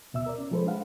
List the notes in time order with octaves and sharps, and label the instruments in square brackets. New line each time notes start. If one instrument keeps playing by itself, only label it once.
[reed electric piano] D2 B2 E5 E6
A#4 D5
C#4
F3 G#3 A4 B4 C5
G#3 D4 B4 F5 F#5